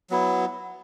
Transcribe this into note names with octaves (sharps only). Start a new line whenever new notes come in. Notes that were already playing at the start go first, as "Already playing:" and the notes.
F#3 B3 E4